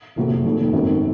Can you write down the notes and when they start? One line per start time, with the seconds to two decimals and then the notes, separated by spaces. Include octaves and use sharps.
0.16 F#1 F2 C3 F#3
0.45 F1 D#2 D#3 F#3
0.72 G#1 F#2 D#3 F#3 C4